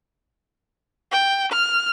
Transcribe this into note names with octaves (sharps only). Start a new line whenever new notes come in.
G5
F6